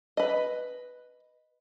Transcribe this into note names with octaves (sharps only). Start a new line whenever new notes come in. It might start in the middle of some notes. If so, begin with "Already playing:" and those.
B4 D#5